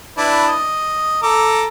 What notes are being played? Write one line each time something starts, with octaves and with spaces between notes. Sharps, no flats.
D4 E4 B4
D#5
A4 A#5 D6